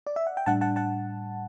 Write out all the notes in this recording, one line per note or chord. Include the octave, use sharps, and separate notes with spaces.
D5
E5
F#5
G5
A2 G3 D4 F#5 A5
F#5 A5
F#5 A5